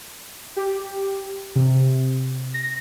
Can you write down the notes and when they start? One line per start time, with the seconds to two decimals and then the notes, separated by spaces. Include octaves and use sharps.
0.57 G4
1.56 C3
2.54 A#6